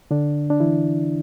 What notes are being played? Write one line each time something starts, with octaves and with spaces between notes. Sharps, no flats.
D3 D4
D4
E3 E4